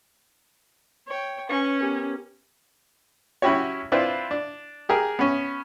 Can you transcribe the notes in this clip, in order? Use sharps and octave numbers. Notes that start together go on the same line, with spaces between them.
C#5 G5
C#4 B4 G#5 C#6
B3 G4 A#4
F#3 C#4 E4 F#4 G4 C#5
C4 D4 E4 F4 B4
D4
G4 G#4 A#4
B3 C#4